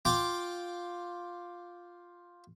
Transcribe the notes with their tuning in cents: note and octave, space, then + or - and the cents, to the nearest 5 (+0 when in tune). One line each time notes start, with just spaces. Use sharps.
F4 +5 G5 +0 D6 +0